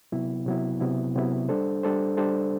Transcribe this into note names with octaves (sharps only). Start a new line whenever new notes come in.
C3 F#3 B3 E4
C3 F#3 B3 E4
C3 F#3 B3 E4
C3 F#3 B3 E4
G3 D4 A4 C5
G3 D4 A4 C5
G3 D4 A4 C5